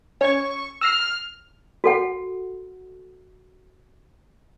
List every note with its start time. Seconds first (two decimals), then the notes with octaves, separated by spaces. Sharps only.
0.21 C#4 C#6 G#6
0.81 E6 F6 A#6 C7
1.84 F#4 A4 F#5